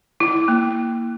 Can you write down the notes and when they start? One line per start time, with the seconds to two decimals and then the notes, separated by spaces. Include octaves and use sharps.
0.20 E4
0.48 A#3